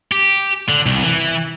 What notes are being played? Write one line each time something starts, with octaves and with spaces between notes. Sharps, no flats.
G4
D3
C2
E3